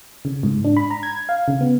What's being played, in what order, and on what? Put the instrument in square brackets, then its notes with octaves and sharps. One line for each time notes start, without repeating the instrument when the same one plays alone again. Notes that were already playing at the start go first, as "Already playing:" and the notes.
[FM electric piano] C#3
G#2
D4
B5
A#5
G#6
F5
C#3
B3